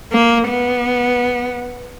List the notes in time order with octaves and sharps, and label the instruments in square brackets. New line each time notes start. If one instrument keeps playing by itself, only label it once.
[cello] A#3
B3